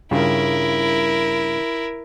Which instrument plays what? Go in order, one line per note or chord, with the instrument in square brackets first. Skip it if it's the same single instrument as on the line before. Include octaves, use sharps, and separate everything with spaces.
[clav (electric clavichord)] G2 C#3 F4 [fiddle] E4 A#4